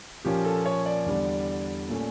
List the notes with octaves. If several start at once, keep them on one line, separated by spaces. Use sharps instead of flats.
A#2 F3 A#3 C#4 G4
A4
C#5
D5
E2 D3 G3
A#2 A3 C#4